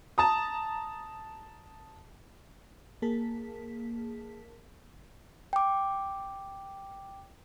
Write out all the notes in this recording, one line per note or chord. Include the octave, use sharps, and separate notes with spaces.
A5 A#5 D#6
A#3 G#4 A#4 A5 B6
G5 D6